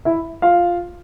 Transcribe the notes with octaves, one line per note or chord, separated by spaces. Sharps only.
E4 E5
F4 F5